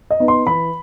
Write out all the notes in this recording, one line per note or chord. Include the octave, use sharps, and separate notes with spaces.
D#5
B3 D#4
C6
E3 B5